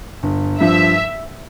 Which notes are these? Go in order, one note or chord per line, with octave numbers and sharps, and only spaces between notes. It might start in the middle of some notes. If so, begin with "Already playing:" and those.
G1
G2 F3 E5